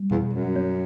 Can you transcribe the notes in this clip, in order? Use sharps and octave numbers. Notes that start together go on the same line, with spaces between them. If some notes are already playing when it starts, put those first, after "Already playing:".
Already playing: G3
E2 B2
F#2
C#4